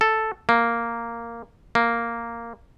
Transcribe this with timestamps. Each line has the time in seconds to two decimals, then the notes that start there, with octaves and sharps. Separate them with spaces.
0.01 A4
0.49 A#3
1.75 A#3